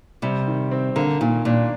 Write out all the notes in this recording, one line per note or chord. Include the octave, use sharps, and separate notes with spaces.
C3 G3
D#3
C4
D3 A#3
A#2 D#3
A#2 D4